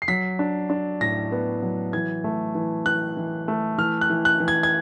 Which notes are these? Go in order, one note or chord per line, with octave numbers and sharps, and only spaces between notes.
C7
F#3 B6
D4
D4
A2 A#6
B3
F#3
E3 G#6
A3
E3
E3 F#6
E3
A3
E3 F6
F#6
E3
F#6
E3
G#6
G#6